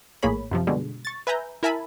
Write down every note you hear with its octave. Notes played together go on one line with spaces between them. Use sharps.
A#1 A2 A#3 G#4 C#5 B5
F#2 C3 F3
B2 D3 G3 G#3
C#6 A6
B4 E5 G#5 A#5 G6
E4 A#4 E5 G#5 A5 B5